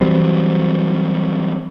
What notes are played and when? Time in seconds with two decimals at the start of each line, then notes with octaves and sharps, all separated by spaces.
0.01 E3 F#3 G3 C4